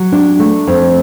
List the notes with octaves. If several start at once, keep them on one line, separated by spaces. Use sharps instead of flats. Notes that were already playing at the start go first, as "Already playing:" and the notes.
Already playing: F#3
D4
A3
F2